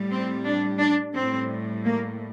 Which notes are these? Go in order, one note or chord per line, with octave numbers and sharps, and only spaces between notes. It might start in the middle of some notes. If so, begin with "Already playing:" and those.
Already playing: A2 G3
C4
D4
D4
A2 G3 C4
A#3